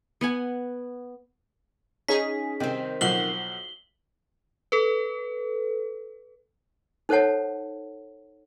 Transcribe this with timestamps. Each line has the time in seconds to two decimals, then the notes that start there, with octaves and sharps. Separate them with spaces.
0.21 B3 F#5 G#5
2.09 C#4 D#4 G#4 B6
2.60 C3 D#3 C4
3.01 B1 F3 F#4 C7 F#7 G7
4.72 A4 B4
7.09 D#4 A4 C5 C#5 F#5 A5